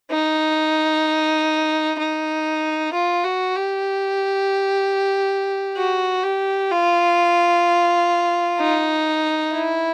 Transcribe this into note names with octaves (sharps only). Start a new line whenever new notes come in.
D#4
D#4
F4
F#4
G4
F#4
G4
F4
D#4
E4